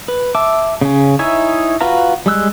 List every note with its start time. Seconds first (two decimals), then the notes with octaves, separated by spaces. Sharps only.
0.08 B4
0.35 E5 A5 D6
0.81 C#3 C#4
1.19 D#4 E4 C#5 E5 G#5
1.81 F4 F#4 B4 F5 A#5
2.26 G3 G#3 E6 F#6